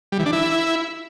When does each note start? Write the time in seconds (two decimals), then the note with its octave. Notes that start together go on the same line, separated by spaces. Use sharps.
0.12 G3
0.19 E3
0.26 D4
0.33 E4